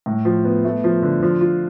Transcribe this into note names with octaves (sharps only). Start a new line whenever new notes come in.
A2
F3
B3
A3
F3
D3
F3
F4